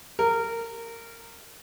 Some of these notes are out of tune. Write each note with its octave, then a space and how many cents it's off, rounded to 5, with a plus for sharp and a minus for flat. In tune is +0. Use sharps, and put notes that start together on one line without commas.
A#4 -20